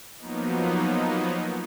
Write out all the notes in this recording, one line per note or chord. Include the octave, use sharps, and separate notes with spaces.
F3 F#3 A#3 B3 D#4